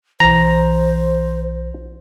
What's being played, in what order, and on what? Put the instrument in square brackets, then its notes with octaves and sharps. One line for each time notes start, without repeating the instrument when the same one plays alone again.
[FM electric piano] B1 E3 [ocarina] C5 [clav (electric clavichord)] A#5